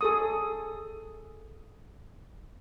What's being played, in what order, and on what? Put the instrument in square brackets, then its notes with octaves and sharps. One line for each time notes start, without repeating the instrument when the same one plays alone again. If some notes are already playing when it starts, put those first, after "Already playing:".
[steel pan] G#4 A4 D#6